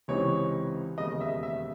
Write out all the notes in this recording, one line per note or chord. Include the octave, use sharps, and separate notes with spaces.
C#2 C3 E3 C4 D#4 C#5
E1 D#2 C#3 D#5
E5
E5